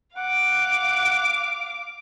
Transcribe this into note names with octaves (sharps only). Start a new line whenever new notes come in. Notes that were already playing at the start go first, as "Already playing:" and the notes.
F5 F#5 D6